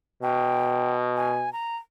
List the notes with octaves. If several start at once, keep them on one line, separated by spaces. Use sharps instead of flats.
B2 G5
G#5
A#5